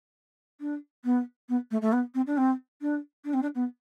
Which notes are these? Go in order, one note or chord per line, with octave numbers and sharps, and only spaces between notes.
D4
B3
B3
A3
A3
B3
C4
D4
C4
D4
D4
C4
D4
B3